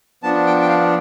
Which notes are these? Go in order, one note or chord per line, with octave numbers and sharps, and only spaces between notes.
F3 B3 D4 A5
G5
G5
F5